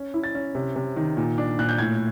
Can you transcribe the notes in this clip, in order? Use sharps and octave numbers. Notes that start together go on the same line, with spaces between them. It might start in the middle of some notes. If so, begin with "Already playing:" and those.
Already playing: C#4
E4
A6
C#4
C3
C3
D#3
A#2
D4
A#2 F#6
G6
A2 G#6